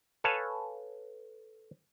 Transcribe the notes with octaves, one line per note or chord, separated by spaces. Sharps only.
A4 B4 C#5 F5 G#5 A5